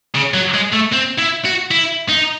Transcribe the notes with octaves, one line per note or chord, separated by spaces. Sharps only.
C#3
F#3
G#3
A3
C4
E4
F#4
E4
D#4